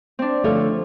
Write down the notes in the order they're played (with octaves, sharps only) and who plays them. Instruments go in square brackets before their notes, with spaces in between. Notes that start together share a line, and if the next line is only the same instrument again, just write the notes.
[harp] C4 D4
[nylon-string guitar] D3 A3 C#5 [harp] F3